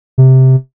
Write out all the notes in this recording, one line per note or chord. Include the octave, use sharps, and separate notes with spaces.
C3